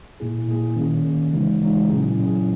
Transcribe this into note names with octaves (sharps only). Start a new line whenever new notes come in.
A#2 A#3 E4 G#4
A#2 A#3 E4 G#4
D#3 A#3 C#4
D#3 A#3 C#4
C#3 E3 G#3 D#4 F#4
C#3 E3 G#3 D#4 F#4
A#2 F#3 C#4 E4 G#4
A#2 F#3 C#4 E4 G#4